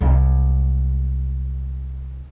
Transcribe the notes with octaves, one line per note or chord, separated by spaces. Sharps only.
C2 G#3